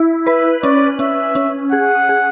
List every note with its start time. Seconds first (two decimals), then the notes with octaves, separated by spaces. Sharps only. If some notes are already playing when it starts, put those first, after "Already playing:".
Already playing: E4
0.27 B4 E5
0.63 C#4 D5
0.99 C#4 E5
1.35 C#4
1.72 G#4 F#5
2.09 G#4